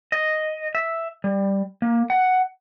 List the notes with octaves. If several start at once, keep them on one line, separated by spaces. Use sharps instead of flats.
D#5
E5
G3
A#3
F#5